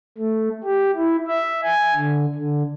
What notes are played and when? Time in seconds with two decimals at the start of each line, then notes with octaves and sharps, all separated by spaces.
0.18 A3
0.64 G4
0.95 E4
1.27 E5
1.63 G#5
1.94 D3
2.35 D3